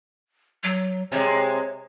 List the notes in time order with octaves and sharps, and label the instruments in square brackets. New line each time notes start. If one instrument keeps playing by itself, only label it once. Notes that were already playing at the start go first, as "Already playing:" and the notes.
[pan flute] F#3
[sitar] C3 G#3 [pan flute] C#5